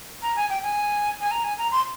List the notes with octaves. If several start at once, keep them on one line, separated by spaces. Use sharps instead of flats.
A#5
G#5
G5
G#5
G#5
A#5
G#5
A#5
C6